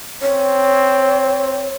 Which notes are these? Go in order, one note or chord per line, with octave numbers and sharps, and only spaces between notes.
C4 C#5